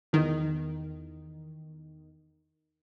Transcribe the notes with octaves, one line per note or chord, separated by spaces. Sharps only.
E2 D#3